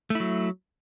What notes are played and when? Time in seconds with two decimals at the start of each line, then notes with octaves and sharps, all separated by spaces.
0.10 A3
0.15 E4
0.20 F#3